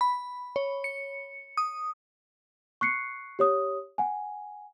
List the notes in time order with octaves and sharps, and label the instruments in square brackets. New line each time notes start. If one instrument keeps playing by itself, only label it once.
[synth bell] B5
C#5
C#7
D#6
[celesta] C#6 F#6 C7 C#7
G4 C#5 D#6
F#5 G#5